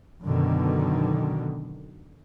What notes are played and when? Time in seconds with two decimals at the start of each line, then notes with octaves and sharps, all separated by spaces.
0.24 F#2 B2 D3 D#3